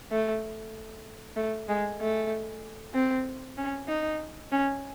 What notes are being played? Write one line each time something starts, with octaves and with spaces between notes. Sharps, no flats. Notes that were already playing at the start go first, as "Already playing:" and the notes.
A3
A3
G#3
A3
C4
C#4
D#4
C#4